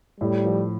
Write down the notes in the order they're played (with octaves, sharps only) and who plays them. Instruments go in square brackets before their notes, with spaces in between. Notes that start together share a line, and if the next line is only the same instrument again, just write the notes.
[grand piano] A2 [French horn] G3
[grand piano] F3